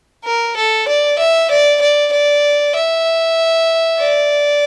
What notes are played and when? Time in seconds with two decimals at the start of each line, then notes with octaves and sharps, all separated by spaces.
0.25 A#4
0.56 A4
0.88 D5
1.19 E5
1.50 D5
1.81 D5
2.12 D5
2.75 E5
4.00 D5